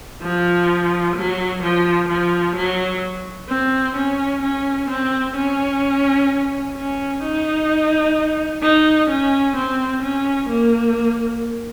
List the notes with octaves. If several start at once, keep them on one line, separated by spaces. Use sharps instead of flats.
F3
F#3
F3
F3
F#3
C4
C#4
C#4
C4
C#4
C#4
D#4
D#4
C#4
C4
C#4
A#3